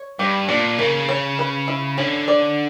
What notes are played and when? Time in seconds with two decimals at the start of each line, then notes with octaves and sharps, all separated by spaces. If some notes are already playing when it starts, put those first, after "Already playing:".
Already playing: C#5
0.19 G2 G4
0.48 A#2 D4
0.78 C#3 A#3
1.09 C#5
1.39 B4
1.68 E4
1.98 D3 C#4
2.28 D5